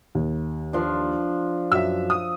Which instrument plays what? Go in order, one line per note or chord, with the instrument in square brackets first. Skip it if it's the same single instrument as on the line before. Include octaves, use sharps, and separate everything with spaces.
[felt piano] D#2
[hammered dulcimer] F3 D4
[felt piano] F#2 [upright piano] E5 E6
[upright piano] D#6